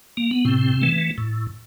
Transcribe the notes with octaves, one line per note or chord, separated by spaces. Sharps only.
A#3
B3
A2 C3 C4
E3 A3
A2